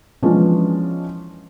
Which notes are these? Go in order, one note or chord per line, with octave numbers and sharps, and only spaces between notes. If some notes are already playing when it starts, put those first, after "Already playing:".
E3 F3 G#3 B3 C#4 D4